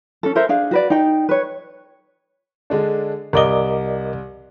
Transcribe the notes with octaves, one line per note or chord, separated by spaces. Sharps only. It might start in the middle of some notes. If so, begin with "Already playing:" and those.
C#4 A4
A4 A#4 C5 E5
D4 G#4 F5
F#4 B4 D5
D#4 G5
B4 C#5
D3 G#3 D4
C2 A#4 D5 D#5 D6 G7